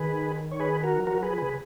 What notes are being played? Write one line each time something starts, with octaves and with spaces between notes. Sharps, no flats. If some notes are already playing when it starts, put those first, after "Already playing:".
Already playing: D#3 G#4 B4
C#5
G#4 B4
F#4 A#4
F#3
F3 F#4 A#4
F#3 G#4 B4
F3
C#3 G#4 B4